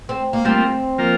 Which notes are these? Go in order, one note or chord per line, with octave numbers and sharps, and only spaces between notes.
C4
A#3
G3 A#3 C4 F4
F3 A#3 F4 A#4